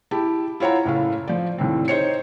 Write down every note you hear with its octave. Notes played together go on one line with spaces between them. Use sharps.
E4 G4 G5 A5
E4 F4 C#5 F#5 A#5
F#1 A2 F5
F3 D5
D#2 A2 C4
D#4 C5 C#5 C#7